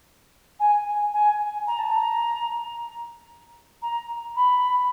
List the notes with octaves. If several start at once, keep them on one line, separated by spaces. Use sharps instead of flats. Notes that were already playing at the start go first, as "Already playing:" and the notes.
G#5
G#5
A#5
A5
A#5
A#5
B5